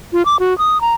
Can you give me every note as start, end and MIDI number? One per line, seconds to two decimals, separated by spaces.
0.13 0.25 65
0.25 0.37 86
0.40 0.57 66
0.58 0.81 87
0.81 0.94 82